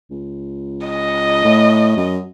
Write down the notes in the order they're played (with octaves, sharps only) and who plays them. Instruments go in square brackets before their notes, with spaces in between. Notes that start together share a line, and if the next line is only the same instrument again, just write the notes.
[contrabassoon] C#2
[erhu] D#5
[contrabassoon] A2
F#2